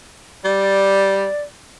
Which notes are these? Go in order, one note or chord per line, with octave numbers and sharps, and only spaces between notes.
G3 D5